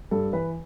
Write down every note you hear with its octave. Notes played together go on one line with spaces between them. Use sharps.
G2 A4
E3 B4